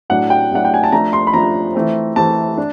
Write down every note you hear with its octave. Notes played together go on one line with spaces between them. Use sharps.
A2 F#3 A3 D4 F#5
G5
A2 F#3 A3 D4 F#5
G5
G#5
A5
F3 A3 D4 A#5
C6
B5
F3 A3 D4 A#5
E3 A3 C4
E3 A3 C4 A5
D4